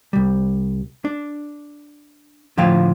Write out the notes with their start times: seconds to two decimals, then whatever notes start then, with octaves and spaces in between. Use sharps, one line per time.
0.13 C2 G3
1.05 D4
2.58 A2 D3 F3 F4 F5 G5